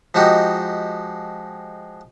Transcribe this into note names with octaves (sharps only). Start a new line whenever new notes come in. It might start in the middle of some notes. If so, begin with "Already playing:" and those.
F3 G#3 D#4 F#4 G4